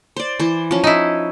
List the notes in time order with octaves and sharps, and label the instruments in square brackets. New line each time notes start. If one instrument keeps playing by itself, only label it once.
[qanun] C5 D5
E3 C5
F3 C#4
[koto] D#4 E4